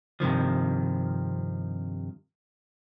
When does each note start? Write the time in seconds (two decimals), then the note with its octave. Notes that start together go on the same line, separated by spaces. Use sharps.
0.20 G2 C3 D#3 F3